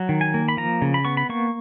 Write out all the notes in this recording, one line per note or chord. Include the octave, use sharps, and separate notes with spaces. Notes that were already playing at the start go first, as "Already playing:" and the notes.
Already playing: F#3
D#3
G#5
A#3
B5
F3 A#5
C#3
B5
B3 C#6
B5
A#3 C#6